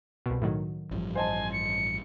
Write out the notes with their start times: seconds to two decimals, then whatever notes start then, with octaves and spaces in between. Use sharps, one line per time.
0.26 C2 B2
0.42 A2 D#3 F#3
0.91 A1 G2 F3
1.15 C5 D#5 G#5 A5
1.53 C#7